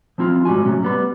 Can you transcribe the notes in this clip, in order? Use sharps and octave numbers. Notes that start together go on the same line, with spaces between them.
F3 C4 E4 F4
G#2 G3 F#4 G#5
A2 C3 F#3 C#4
G3 B3 B5